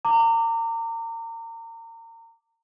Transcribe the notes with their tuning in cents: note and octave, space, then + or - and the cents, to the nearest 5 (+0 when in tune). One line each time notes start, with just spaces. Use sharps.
A#5 -35 D6 +0